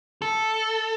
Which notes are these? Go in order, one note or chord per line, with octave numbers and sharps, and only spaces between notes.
A4